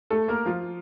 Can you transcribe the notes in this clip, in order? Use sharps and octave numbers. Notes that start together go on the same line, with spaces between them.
A3 A4
A#3 A#4
F3 F4